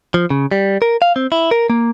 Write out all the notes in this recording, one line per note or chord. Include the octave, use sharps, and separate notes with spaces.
F3
C#3
G3
A#4
F5
C4
E4
A#4
A#3